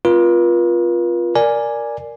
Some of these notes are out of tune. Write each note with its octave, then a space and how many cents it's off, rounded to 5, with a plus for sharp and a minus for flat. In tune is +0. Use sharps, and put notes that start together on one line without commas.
C4 +20 F4 +0 B4 -45
A#4 +0 D5 +0 G#5 +0